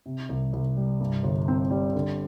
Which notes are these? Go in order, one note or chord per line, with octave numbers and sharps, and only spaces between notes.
C3
C2
C2
G3
G2
G1
C4
G3
D3